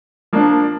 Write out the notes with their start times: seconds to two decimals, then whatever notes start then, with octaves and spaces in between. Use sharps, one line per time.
0.33 F3 A#3 D4